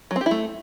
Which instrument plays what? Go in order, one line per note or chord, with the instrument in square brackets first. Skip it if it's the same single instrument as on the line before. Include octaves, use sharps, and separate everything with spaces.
[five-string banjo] F#3
C4
G4
E4
A3